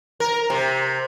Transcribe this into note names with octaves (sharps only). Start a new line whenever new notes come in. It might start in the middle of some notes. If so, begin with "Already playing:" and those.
A#4
C3